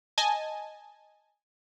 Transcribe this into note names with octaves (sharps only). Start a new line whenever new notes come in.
D#5 G#5 A5